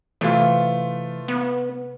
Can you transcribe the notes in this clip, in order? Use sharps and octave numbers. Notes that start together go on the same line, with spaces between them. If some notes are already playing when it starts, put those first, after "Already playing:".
C3 E3 A3 F4
B3